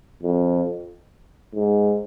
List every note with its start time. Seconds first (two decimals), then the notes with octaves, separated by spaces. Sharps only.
0.23 F2
1.55 G#2